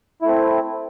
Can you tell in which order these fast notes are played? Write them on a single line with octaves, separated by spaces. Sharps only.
E4 A3 C4